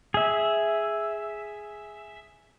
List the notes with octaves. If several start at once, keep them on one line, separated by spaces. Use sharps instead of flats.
G#4 E5